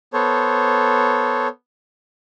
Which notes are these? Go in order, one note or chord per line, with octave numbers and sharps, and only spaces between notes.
B3 A4 C5 C#5